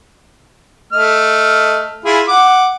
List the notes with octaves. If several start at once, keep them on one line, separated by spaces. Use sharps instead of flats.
A3 D#5 F6
E4 F4 G#4
F#5 D6